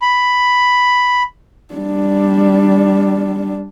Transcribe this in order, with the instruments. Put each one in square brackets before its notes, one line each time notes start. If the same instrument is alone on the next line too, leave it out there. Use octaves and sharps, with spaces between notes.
[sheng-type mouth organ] B5
[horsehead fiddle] G3 D4